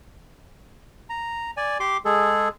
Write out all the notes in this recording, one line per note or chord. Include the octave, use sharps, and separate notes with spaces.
A#5
D5 G#5
G4 C6 D6
G#3 G#4 A4